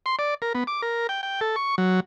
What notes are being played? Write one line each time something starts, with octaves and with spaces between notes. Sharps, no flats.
C6
D5
A#4
B3
D6
A#4
G5
G5
A4
C#6
F#3